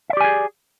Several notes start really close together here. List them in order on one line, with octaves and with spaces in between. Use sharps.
E5 D5 G4 G#5 G#4